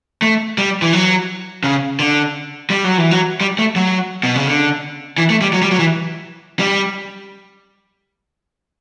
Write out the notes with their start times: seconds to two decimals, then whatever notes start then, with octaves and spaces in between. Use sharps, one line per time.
0.22 A3
0.58 G3
0.82 E3
0.93 F#3
1.64 C#3
2.00 D3
2.70 G3
2.84 F#3
2.98 E3
3.11 F#3
3.41 G3
3.59 A3
3.76 F#3
4.23 B2
4.35 C#3
4.47 D3
5.18 E3
5.30 A3
5.41 G3
5.53 F#3
5.62 G3
5.71 F#3
5.79 E3
6.59 G3